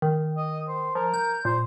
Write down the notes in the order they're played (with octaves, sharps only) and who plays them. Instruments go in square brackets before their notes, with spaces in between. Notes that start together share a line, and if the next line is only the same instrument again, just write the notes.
[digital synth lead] D#3
[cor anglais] D#5
C5
[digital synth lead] F3 [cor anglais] A#4
[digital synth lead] G6
[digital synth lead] A#2 [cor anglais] C5